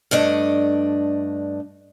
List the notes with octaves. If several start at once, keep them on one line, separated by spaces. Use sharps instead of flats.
G2 A3 D4 D#5